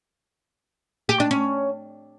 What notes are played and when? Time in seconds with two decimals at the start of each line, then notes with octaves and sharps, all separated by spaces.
1.09 G4
1.20 D4
1.31 C#4